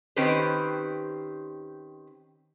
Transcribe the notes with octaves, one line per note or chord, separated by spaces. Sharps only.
D#3 C4 C#4 G4 B4 C5